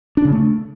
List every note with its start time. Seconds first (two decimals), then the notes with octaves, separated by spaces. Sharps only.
0.17 D4
0.25 C#3
0.32 A3